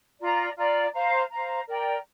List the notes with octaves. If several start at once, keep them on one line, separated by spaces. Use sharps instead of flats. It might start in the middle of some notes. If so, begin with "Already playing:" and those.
F4 D5 A#5
F4 D5 A#5
C5 F5 A#5
C5 F5 A#5
A#4 D5 G5 A#5